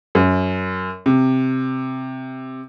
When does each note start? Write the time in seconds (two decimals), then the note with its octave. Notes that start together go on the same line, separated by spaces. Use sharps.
0.15 F#2
1.06 C3